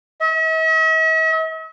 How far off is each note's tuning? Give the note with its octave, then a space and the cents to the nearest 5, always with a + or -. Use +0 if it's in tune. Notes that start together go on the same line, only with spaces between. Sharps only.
E5 -45